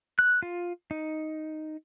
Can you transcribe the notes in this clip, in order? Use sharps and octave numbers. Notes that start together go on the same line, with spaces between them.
F#6
F4
D#4